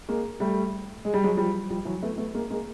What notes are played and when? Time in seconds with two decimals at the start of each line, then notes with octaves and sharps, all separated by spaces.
0.08 G#3 A#3
0.40 G3 A3
1.05 G#3
1.14 G3
1.23 F#3 G#3
1.37 F3 G3
1.70 F3 G3
1.85 E3 F#3
2.03 A3 B3
2.18 A3 B3
2.34 G#3 A#3
2.50 G#3 A#3